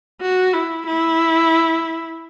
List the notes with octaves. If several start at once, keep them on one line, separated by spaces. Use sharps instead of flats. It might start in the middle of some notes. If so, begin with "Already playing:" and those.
F#4
E4
E4